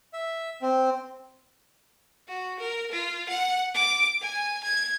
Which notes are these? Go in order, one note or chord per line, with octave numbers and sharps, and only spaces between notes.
E5
C4
F#4
A#4
F4
F#5
D6
G#5
G#6